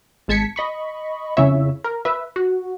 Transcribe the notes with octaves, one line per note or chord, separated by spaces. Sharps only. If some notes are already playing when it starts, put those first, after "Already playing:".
G#1 G#3 A5 G#6 B6 C#7
D#5 B5 C#6
F2 C#3 E4 C#5 E5
A#4
B4 E5
F#4